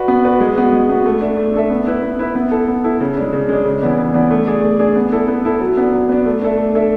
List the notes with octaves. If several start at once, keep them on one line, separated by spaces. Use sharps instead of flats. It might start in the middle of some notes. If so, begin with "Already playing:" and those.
Already playing: F#4 B4 D5
B3
F#4 B4 D5
G#3
B3 F#4
G#3
B3 F#4
A3
D4 A4 E5
A3
D4 A4 E5
B3
E4 B4 E5
B3
E4 B4 E5
B3
E4 A4
B3
E4 A4
C#3
G#3 D4
C#3
G#3 D4
C#3
E3 B3 D4
C#3
E3 B3 D4
A3
D4 G#4 D5
A3
D4 G#4 D5
B3
E4 A4
B3
E4 A4
F#3
B3 D4
F#3
B3 D4
A3
D4 A4 E5
A3
D4 A4 E5